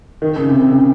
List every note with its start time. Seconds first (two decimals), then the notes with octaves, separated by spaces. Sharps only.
0.22 D#3
0.36 C#3
0.49 C3
0.64 C#3